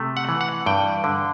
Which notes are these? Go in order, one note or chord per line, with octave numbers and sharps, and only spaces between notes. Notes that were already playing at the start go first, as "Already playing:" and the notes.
Already playing: C3 A3
F#5
E3
F#5
G2 G5
D3